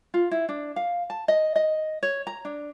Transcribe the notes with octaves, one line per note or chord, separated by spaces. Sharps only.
F4
E4
D4
F5
A5
D#5
D#5
C#5
A#5
D4